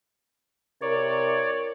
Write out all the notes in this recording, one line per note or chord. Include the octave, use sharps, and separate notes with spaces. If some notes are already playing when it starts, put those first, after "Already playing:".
C3 E4 A#4 C#5 D5